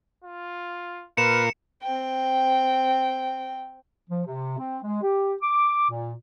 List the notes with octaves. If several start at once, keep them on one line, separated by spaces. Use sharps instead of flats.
F4
A#2 F4 A#4 B4 C#7 E7
C4 G5
F3
C3
C4
G#3
G4
D6
A#2